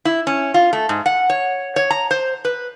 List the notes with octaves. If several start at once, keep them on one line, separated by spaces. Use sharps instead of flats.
E4
C#4
F4
A3
G#2
F#5
C#5
C#5
A#5
C5
B4